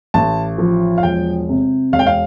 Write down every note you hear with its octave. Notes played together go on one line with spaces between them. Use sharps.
A1 A5
F3
F5
E1 G5
C3
E1 F5
G5
F5